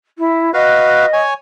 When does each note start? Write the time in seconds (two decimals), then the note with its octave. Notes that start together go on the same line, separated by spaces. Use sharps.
0.18 E4
0.54 F#4 B4 D#5 F5
1.13 C#5 G#5